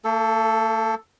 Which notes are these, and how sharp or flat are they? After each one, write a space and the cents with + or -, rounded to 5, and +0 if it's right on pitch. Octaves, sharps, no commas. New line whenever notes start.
A3 +45 A4 +0